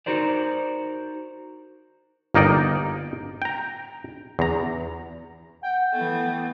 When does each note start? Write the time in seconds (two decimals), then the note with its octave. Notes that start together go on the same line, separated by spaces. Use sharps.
0.06 D#4 F#4 A#4 C5 D5
2.34 G1 A#3 D#4 D5 G5
3.42 G5 A#5
4.39 E2 A#5
5.63 F#5 G5
5.94 E3 A3 B3